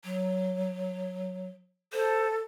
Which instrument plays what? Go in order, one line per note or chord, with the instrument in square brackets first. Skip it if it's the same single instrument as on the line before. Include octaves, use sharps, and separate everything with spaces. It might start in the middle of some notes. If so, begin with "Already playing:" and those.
[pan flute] F#3
[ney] A4 [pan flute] C5